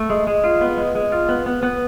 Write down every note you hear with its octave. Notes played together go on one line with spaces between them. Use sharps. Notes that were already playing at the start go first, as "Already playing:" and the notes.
Already playing: A3
G#3
G#3
F4
B3
G#3
G#3
F4
B3
B3
B3